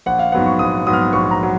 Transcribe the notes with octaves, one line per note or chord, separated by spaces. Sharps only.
A#1 F#5
F5
G#2 F#3 B3 F#5
C#6
A#1 D#6
G#2 F#3 B3 D#6
F6
D#6
A#1 C#6
A#5
F#3